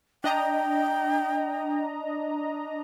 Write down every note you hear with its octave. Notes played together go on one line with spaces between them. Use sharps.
D4 D#5 G5 A#5